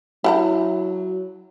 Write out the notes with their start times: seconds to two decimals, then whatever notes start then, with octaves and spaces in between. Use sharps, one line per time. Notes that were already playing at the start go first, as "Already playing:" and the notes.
0.24 F#3 E4 F#5 A#5